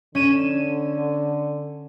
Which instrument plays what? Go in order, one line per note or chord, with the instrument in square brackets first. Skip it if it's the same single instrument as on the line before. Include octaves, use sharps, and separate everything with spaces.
[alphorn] D3 [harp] C#4 D#7 E7